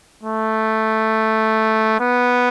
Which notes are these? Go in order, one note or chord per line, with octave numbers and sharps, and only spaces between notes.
A3
B3